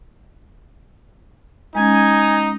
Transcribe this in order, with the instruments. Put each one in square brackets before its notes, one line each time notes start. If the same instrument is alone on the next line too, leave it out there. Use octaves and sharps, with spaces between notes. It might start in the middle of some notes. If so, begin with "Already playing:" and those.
[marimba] G#3 C#4 [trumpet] D#4 [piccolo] G#5